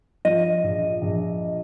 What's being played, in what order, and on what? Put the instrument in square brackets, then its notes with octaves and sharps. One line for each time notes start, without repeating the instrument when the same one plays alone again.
[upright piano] F3 [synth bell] D#5
[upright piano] A#1
A#1